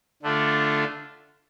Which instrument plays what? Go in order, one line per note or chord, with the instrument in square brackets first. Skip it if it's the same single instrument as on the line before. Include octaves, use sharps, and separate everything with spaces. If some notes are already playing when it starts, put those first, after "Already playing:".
[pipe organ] D3 A3 D4 F4